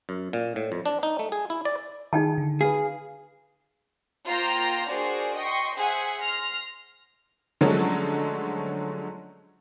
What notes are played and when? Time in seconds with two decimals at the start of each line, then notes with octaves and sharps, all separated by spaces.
0.09 F#2
0.33 A#2
0.56 A2
0.72 F2
0.86 D4
1.03 D#4
1.19 A3
1.32 G#4
1.50 E4
1.65 D5
2.13 D#3 D#4 G#4 G5 A5
2.38 D3
2.61 G#4 B4 F5
4.27 A#3 F4 C5 G5 A#5 A#6
4.89 D4 F#4 G#4 A#4 C5 D5
5.36 D#5 G5 C6 C#6
5.77 G#4 C5 E5 F#5 G#5
6.22 C6 F6 A#6
7.61 D3 F3 F#3 G#3 A3 C#4